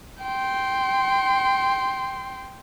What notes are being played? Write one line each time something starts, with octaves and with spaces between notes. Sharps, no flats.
G5 C6